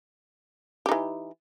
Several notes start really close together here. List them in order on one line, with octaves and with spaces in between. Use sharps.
G4 D#4 E3